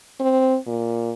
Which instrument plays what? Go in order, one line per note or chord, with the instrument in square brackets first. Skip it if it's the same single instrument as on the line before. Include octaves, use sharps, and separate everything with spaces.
[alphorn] C4
A#2